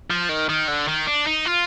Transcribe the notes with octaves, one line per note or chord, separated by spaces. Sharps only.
F3
D#3
D#3
D3
D#3
D4
D#4
F4